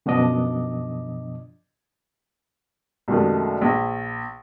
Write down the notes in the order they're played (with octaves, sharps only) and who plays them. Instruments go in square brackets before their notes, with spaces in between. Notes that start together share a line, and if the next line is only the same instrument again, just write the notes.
[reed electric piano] F#2 B2 F3 D4 D#5 D6
[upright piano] C2 F#2 D#3 G#3 A3
A#1